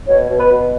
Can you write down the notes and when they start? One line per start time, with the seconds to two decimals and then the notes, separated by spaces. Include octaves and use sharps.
0.08 B2 C#5
0.30 B2
0.40 B4
0.50 B2